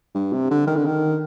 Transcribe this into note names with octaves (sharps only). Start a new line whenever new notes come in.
G2
C3
D3
D#3
D3
D#3